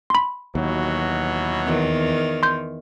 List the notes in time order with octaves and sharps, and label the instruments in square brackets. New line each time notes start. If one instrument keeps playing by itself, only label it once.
[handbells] B5 C6
[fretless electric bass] D#2 [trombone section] B2 E3 F#3
[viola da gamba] E2 D#3
[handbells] C6 G6